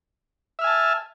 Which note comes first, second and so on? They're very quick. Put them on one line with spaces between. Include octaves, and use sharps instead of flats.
E5 F6 G#5 A5